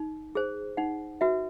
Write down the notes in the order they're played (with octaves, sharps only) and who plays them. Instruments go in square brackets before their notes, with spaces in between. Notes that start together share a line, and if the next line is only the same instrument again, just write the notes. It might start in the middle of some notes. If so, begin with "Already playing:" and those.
Already playing: [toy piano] D#4
G#4 C5
D#4 F#5
F#4 B4 E5